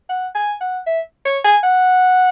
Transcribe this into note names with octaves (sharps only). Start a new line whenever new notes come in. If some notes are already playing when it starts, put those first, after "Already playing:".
F#5
G#5
F#5
E5
C#5
G#5
F#5